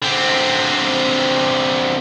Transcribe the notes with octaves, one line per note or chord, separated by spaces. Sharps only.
D3 C4